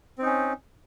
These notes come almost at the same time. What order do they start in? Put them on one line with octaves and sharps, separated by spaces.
C4 D#4 C#4